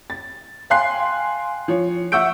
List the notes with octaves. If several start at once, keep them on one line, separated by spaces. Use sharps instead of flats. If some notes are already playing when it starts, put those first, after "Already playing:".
A6
F5 G5 G#5 C6 F#6 C7
F3 C#5
E5 F#5 C#6 E6 G6 D7